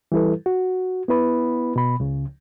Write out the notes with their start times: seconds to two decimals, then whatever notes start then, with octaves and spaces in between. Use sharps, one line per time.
0.12 E3 G3 E4 A4 B4
0.46 F#4
1.08 B3 E4 B4 B5
1.76 B2 B5
2.00 C#2 C#3